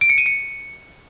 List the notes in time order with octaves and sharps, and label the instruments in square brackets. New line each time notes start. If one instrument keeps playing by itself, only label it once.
[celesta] D7
C#7
D#7
C#7